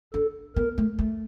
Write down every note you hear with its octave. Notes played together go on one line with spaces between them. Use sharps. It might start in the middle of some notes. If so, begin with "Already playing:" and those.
D4 A4
B3 A#4
A3
A3